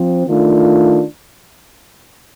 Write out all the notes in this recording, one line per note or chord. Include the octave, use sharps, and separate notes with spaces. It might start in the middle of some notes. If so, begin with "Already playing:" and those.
Already playing: F3 C4
D#3 A3 D4 F4